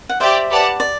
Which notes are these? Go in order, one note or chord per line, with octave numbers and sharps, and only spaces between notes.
F#5
G4 C5 D5 E5 G5
G4 B4 D5 F#5 A5
D5